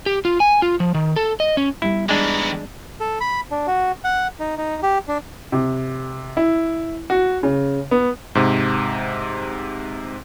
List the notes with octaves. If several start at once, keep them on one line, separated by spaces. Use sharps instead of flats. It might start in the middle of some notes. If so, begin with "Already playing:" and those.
G4
F4
G#5
F4
F3
D#3
A4
D#5
C#4
G3 B3 E4
D#3 E3 G#3 D4
A4
B5
D4
F#4
F#5
D#4
D#4
G4
D4
C3
E4
F#4
C#3
B3
G#2 C3